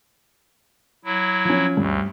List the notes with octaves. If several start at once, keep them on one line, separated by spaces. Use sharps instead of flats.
F#3 E4
F3 C#4
D2 G2